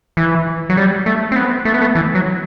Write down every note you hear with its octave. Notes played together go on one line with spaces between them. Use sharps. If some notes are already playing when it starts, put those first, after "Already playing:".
E3
F#3
G3
A3
C4
B3
A3
B3
A3
E3
F#3